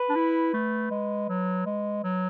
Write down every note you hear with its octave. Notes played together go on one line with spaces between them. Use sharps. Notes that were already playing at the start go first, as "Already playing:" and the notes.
Already playing: B4
D4
E4
A3
G#3
F#3
G#3
F#3